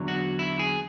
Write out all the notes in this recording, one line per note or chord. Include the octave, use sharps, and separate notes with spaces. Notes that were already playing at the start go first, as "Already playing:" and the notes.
Already playing: E2 D3 F#3
F#4
E4
G#4